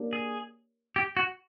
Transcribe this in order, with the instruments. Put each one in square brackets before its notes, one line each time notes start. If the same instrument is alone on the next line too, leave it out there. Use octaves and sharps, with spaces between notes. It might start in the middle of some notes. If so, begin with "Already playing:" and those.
Already playing: [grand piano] A#3 D4 G4 A#4 C#5
[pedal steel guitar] G#4
G4
F#4